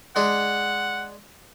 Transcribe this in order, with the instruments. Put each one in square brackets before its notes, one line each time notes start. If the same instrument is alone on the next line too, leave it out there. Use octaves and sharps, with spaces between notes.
[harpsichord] G#3 D4 [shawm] F#5